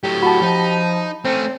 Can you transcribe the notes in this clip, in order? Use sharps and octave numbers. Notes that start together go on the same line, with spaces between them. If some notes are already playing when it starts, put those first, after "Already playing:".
A2 F#3 G4
F#4 A5 B5
F3 D#4
A3 C4 C#4